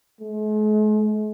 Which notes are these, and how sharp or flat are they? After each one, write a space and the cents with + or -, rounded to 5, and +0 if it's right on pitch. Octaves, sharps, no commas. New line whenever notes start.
G#3 +45